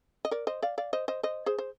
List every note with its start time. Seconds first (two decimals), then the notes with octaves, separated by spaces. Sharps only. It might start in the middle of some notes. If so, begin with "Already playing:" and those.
0.25 D#5
0.31 A#4 D5
0.47 C5 D#5
0.62 D5 F5
0.78 D5 F5
0.93 C5 D#5
1.08 C5 D#5
1.23 C5 D#5
1.46 G#4 C5
1.59 C5